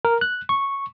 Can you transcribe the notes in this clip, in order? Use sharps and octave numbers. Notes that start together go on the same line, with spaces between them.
A#4
F#6
C#6